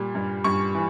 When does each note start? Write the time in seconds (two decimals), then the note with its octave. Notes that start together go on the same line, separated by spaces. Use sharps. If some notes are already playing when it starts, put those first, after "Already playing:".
Already playing: A#2 G3
0.15 G2
0.44 G2 C#6
0.75 E3